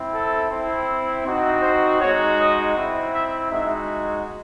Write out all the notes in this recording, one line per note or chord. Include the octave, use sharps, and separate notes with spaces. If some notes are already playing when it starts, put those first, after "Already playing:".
Already playing: C4 E4
A4
C4 E4
C4 D#4 F#4
C5
G#3 D#4 F#4 C#5
D#5
C4 E4
E5
G#3 D#4 F#4 E5